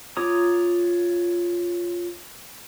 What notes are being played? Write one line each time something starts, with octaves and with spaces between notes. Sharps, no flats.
F4 C#5 A#5 D6 D#6